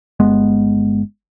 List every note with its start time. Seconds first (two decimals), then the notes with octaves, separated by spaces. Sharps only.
0.20 G1 G#3 B3